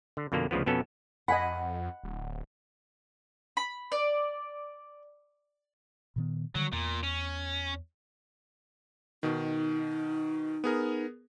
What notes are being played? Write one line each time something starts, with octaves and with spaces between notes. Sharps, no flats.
D3
F2 B2 D3 A#3
D2 C#3 F3 B3
F2 B2 B3 C#4 A4
F2 D#5 F#5 G#5 B5
D1
B5
D5
A#2 D#3 B3
D3 D#3 F#3 G3
E2 A#2
C#4
B2 D#3 D#4
B3 G#4 A#4